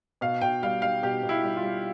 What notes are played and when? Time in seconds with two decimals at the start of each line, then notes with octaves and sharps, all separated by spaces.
0.21 B2 F5
0.41 B2 G5
0.63 G3 F5
0.82 G3 F5
1.03 B2 G4
1.23 B2
1.29 E4
1.44 G3
1.57 F4
1.63 G3